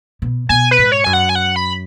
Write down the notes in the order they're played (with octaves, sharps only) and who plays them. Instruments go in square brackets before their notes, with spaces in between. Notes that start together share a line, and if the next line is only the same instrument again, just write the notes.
[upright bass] B2
[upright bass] B2 [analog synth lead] G#5
[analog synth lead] B4
[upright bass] G#2
[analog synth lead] C#5
[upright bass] F#2 [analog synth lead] G#5
[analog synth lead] F#5
G#5
F#5
B5